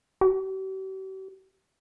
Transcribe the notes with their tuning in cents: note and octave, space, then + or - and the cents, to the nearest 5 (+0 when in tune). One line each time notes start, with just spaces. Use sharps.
G4 -45